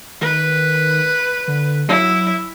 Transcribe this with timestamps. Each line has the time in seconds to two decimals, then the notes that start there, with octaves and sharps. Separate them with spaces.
0.21 D#3 B4
1.48 D3
1.88 F#3 E4